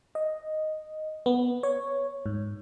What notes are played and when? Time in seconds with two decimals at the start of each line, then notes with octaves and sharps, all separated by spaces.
0.15 D#5
1.26 B3
1.63 C#5
2.26 G#2